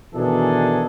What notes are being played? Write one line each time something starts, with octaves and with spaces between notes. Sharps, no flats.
B2 D#3 E3 D4 G#4 A4